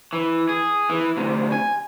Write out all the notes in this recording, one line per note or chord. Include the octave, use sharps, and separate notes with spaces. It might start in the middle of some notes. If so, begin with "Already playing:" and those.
E3
G#4
E3
D2 C3
G#5